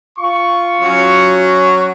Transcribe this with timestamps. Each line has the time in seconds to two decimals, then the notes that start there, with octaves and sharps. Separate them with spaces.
0.19 F4 C#6
0.81 F#3 C#4 F#4